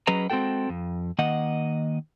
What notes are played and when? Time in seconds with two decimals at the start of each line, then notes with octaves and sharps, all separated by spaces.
0.07 F#3 C#4 G#4 B4 D#5 A#5
0.30 G#3 C4 C#4 F#4 A4 G5
0.69 F2
1.19 D#3 A#3 D#5 F#5